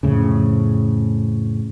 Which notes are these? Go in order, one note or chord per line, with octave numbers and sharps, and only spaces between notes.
F2 A2 C#3